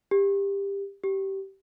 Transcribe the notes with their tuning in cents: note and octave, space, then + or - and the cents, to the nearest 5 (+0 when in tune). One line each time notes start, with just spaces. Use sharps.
G4 +20
G4 -20